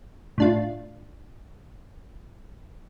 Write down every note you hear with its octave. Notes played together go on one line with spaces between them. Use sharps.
A2 D4 F4